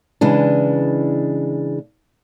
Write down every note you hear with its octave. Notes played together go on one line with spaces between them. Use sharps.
C#3 E3 G#3 D4